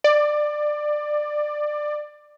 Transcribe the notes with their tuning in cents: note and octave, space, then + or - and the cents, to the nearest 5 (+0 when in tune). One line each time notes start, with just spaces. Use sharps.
D5 +20